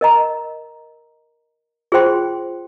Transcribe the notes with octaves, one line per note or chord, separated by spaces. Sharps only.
A#4 D#5 A#5
F4 G#4 C5 G5 C6